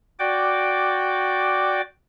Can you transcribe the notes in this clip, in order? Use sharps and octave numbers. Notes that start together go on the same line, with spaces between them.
F#4 D5 G5 D6